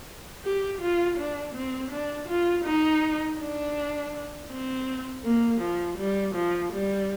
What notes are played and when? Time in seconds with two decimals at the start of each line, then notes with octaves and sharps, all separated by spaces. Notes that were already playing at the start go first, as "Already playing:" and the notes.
0.44 G4
0.81 F4
1.18 D4
1.55 C4
1.91 D4
2.28 F4
2.65 D#4
3.39 D4
4.50 C4
5.24 A#3
5.61 F3
5.98 G3
6.35 F3
6.72 G3